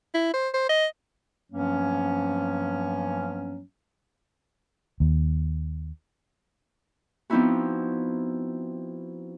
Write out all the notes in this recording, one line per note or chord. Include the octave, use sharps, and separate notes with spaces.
E4
C5
C5
D#5
G2 F3 F#3 A#3 B3 C#4
D#2
F3 B3 C4 D#4 E4 F#4